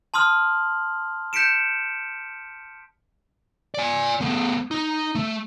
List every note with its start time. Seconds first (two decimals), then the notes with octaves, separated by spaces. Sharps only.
0.14 A5 C6 D#6 F6 F#7
1.33 G6 B6 C#7 D7 E7
3.74 D5 G#5
4.21 A3 B3
4.71 D#4
5.15 A3